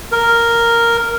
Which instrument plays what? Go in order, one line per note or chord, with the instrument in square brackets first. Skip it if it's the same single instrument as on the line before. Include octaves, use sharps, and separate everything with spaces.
[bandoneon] A#4